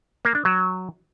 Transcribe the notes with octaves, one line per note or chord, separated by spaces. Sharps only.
A#3
D4
F#3